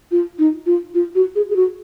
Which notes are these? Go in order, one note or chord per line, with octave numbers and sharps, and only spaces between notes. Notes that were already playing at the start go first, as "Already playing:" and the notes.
F4
D#4
F4
F4
F#4
G#4
G#4
F#4